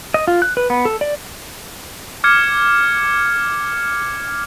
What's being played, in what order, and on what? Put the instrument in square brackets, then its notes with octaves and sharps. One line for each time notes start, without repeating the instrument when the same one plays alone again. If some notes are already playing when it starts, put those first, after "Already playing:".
[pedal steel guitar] D#5
F4
F#6
B4
B3
A4
D5
[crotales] D6 F6 G#6 C#7